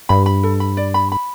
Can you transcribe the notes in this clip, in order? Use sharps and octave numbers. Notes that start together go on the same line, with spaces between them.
G2 B5
B5
A4
B5
D5
B5
B5